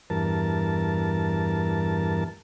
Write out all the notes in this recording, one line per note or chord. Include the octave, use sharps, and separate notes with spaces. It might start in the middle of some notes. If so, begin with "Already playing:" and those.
E2 G2 A#4 A5